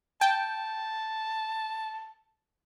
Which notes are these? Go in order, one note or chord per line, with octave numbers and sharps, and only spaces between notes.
G5 A5